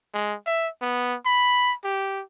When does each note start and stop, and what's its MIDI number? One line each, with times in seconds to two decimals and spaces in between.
0.14 0.35 56
0.47 0.68 76
0.82 1.15 59
1.26 1.74 83
1.84 2.22 67